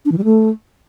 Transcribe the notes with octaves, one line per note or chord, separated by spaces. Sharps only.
D4
E3
G3
A3